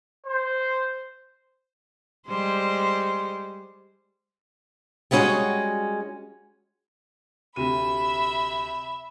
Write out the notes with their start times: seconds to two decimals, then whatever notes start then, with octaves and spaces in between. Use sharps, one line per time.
0.25 C5
2.27 G3 G#3 C5
5.11 G3 G#3 B3 C#4 F#4 G#4
7.56 D2 C3 E5 B5 D#7